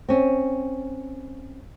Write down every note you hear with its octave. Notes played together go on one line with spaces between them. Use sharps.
C4 C#4